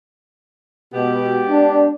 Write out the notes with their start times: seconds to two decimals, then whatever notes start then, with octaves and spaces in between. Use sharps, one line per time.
0.94 B2 G#3 B3 G4
1.48 D4